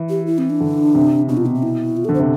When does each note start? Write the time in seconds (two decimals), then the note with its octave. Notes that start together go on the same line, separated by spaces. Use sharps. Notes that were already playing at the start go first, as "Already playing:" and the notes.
Already playing: E3
0.10 G4
0.27 E4
0.38 C4
0.50 D4
0.61 D3
0.95 C3
1.28 B2 D4
1.37 F4
1.46 B3
1.55 C4
1.63 E4
1.97 F4
2.05 A4
2.09 D3
2.14 C5
2.19 C3